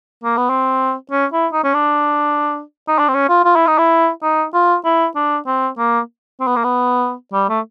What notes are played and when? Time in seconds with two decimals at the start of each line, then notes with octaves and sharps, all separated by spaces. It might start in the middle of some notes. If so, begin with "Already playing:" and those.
0.24 A#3
0.37 B3
0.50 C4
1.11 C#4
1.33 E4
1.53 D#4
1.64 C#4
1.74 D4
2.88 D#4
2.98 D4
3.08 C4
3.14 C#4
3.29 F4
3.44 F4
3.56 E4
3.67 D#4
3.78 E4
4.23 D#4
4.53 F4
4.84 E4
5.16 D4
5.46 C4
5.78 A#3
6.40 C4
6.47 B3
6.56 A#3
6.64 B3
7.33 G3
7.49 A3